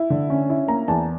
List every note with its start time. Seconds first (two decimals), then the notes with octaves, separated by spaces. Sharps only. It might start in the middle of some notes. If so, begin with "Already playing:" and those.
Already playing: E4
0.10 D3
0.30 C#4
0.50 E4
0.68 A#3 A#5
0.88 E2 A5